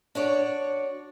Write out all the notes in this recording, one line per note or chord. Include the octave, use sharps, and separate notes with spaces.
D4 F#4 C#5 D5